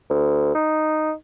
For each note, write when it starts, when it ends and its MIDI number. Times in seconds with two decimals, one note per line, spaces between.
0.10 0.52 38
0.55 1.13 63